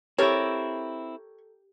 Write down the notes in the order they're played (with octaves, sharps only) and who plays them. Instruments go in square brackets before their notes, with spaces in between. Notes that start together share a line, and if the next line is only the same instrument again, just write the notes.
[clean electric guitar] C4 E4 [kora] G4 A4 A#4 [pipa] C#5